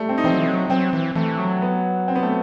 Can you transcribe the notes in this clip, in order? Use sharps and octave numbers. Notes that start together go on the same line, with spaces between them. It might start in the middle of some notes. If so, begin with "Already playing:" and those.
Already playing: G3 A3
C4
D#4
E3 C4
F#3
E3
F#3
F#3 C4
E3
E3 A3
F#3
B3
C4
B3
A3